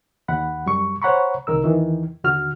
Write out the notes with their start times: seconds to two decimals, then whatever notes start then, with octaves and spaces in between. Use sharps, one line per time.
0.28 D#2 F#5 B5
0.66 F#2 G3 C#6
1.02 C5 C#5 F#5 A#5 B5 C#6
1.47 C2 D#3 A#4 E6
1.63 E2 D#3 E3
2.24 D#2 D3 F#4 F6